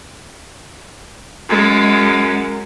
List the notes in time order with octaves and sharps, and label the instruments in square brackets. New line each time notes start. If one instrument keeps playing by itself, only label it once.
[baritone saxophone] F#2 [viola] G#3